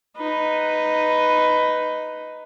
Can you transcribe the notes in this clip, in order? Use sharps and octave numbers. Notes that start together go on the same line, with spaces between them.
D#4 B4